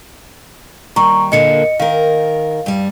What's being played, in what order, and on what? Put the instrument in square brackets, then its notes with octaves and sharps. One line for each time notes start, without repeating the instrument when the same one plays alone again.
[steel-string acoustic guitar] D#2 G3 [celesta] A#5 C#6
[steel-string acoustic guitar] A#2 D3 A#3 [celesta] D#5 C#7
[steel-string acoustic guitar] D#3 A#4 [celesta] F5
[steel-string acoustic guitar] G2 G3